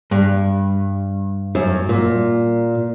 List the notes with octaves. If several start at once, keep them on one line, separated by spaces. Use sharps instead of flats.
G2
F#2
A#2